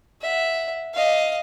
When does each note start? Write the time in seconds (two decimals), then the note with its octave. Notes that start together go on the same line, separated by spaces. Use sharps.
0.21 E5 F#5
0.94 D#5 F5